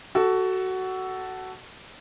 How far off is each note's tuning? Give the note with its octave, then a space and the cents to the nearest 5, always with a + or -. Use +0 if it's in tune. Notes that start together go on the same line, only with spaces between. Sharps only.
F#4 +15 A4 +0